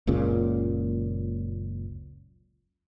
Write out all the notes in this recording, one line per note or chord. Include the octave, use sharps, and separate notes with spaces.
F#1 C#2 A#2 C#3